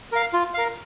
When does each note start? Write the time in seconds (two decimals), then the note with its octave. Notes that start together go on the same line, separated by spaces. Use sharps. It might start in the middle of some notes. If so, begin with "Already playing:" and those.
0.12 A#4 F5
0.33 F4
0.54 A#4 F5